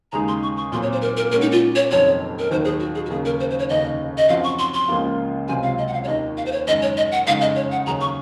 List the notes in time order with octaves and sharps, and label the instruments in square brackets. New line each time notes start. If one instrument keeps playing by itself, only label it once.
[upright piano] D#2 C#3 G#3 D#4 G#4 [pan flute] A#5
[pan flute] C6
C#6
C#6
[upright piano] A#2 F#3 C4 [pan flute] C6
[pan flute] C#5
C5
A#4
A#4
[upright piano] A#2 G#3 C#4 F#4 [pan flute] A#4
[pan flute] D#4
F4
C#5
[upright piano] F1 F2 D#3 F#3 C4 [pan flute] C#5
[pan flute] A#4
[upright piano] D#2 D#3 F#3 [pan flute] C5
[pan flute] G#4
F#4
G#4
F#4
[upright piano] D#2 C#3 F#3 A#3 [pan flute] G#4
[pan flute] A#4
C5
C5
C#5
[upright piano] F1 D#2 C#3 [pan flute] D#5
[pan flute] D#5
[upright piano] F#2 F3 C4 F#4 [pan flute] F5
[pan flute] C#6
C6
C6
[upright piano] C#2 C#3 F3 A#3 F4
[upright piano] C#2 C3 F#3 C4 F4 [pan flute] G#5
[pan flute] F5
D#5
F#5
F5
C#5
[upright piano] D#2 D#3 A#3 [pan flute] D#5
[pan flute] F5
C5
C#5
[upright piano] F#1 F#2 D#3 G#3 [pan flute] D#5
[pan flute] C#5
D#5
F#5
[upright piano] F#1 F2 C#3 G#3 D#4 [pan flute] F5
[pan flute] D#5
C#5
F#5
[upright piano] D#2 C#3 F#3 C#4 G#4 [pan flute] A#5
[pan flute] C#6